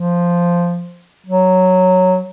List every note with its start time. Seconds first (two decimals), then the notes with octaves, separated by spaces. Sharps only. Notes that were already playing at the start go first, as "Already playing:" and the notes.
Already playing: F3
1.27 F#3